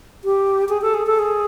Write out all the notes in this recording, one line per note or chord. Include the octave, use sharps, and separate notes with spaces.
G4
G#4
A4
G#4
A4
G#4